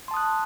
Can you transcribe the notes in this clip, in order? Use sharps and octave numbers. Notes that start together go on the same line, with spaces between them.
A5 C6 D#6 F#6